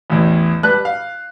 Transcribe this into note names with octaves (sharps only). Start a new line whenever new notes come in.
A1 E2
G3 B4 A5 F#6
F5